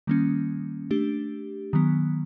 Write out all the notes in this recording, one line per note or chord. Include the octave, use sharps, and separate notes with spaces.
D#3 G3 A#3 C#4
A3 D4 G4
D#3 F#3 B3